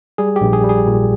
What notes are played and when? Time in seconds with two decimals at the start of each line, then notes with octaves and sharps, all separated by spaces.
0.18 G3 G#4
0.36 A#1 G4
0.53 G#4
0.64 G3
0.69 G#4
0.87 A#2